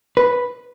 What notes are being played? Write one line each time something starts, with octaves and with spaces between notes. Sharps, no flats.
B4